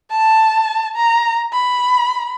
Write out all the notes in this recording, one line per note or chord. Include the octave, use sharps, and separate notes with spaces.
A5
A#5
B5